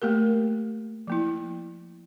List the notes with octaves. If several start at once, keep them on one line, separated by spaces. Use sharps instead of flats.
A3 A#3 G4 A#4
F3 A#3 E4